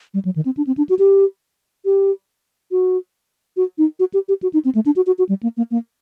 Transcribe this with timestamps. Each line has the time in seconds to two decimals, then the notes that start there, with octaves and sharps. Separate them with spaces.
0.14 G3
0.25 F#3
0.36 D#3
0.45 C4
0.57 D4
0.67 C4
0.77 D4
0.89 F#4
0.99 G4
1.85 G4
2.71 F#4
3.57 F#4
3.78 D#4
4.00 F#4
4.14 G4
4.28 G4
4.43 F#4
4.53 D#4
4.65 C4
4.75 A3
4.86 D4
4.96 F#4
5.07 F#4
5.18 F#4
5.29 G3
5.43 A#3
5.57 A#3
5.71 A#3